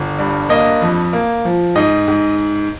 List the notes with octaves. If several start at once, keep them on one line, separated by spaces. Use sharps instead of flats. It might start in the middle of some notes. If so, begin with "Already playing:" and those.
Already playing: G1
G2
A#3 D#5
F2
A#3
F3
G#2 D#5
G#2